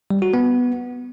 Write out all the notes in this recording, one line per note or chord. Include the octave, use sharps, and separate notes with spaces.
G3
F#4
B3